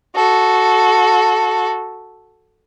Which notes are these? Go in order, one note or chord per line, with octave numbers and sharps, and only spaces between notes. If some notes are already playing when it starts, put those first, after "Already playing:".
F#4 A4